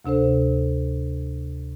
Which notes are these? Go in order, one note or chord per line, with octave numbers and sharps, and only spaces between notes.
D2 C3 D4 A4 C5